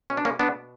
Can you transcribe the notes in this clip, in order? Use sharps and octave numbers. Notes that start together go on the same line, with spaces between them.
B2 C#4
D4
A#3 C#4
B3 D4